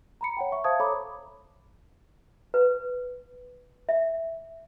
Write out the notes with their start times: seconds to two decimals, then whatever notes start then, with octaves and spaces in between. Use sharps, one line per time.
0.21 A#5 B5 C#7
0.37 C#5 F#5 G5
0.52 E5 C#6
0.64 C5 E5 F5 A5 D#6 G#6
0.80 A4 C#5 A#5 B5 D6
2.54 B4
3.89 E5